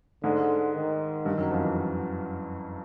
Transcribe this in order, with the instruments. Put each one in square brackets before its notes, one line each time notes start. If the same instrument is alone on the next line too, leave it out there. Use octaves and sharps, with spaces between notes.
[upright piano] G#2 G#3 [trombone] D3
[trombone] D#3
[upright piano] G2 G3
F#2 F#3
F2 F3
E3